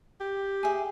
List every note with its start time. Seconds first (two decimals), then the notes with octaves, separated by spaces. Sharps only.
0.21 G4
0.63 G#4 E5